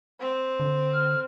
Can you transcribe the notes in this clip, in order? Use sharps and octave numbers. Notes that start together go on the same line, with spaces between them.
C4
D3
F6